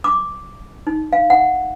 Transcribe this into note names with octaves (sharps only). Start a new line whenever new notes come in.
D6
D#4
F5
F#5